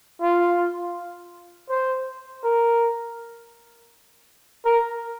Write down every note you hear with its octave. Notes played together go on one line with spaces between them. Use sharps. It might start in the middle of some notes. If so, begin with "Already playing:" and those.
F4
C5
A#4
A#4